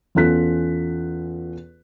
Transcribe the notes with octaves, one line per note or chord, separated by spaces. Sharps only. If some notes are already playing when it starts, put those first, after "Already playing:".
E2 C#4 F4 A4 F#6 B6